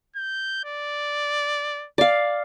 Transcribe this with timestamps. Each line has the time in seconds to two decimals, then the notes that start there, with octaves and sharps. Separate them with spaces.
0.16 G6
0.65 D5
1.98 D5 F5